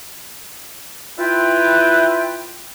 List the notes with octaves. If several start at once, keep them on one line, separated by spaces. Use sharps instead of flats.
E4 F4 B4 G5